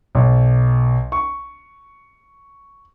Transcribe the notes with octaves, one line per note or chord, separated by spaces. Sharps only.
B1
C#6